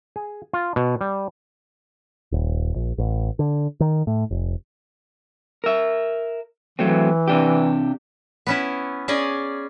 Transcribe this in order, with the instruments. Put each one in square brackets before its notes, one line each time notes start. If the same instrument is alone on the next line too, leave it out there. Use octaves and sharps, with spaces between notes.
[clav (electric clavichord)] G#4
F4
B2
G3
[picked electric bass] D#1
A#1
A1
D3
D#3
A2
F1
[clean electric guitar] A#4 E5
[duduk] E3 [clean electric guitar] F#3 A3 C4
[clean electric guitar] C3 D4 G4
[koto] B3 C#4 E4
C#4 G#4 D5 D#5